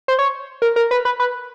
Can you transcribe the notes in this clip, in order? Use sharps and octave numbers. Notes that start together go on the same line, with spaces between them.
C5
C#5
A#4
A#4
B4
B4
B4